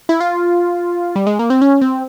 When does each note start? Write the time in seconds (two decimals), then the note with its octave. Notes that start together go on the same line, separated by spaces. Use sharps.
0.09 E4
0.20 F4
1.16 G3
1.27 G#3
1.39 A#3
1.50 C4
1.62 C#4
1.82 C4